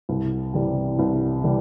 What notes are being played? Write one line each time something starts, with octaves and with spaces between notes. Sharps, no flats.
C2
C3 E3 G3
C2
C3 E3 G3